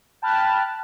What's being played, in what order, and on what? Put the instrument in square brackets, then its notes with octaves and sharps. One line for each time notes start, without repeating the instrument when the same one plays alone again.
[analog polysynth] G5 A5 B5 F6 F#6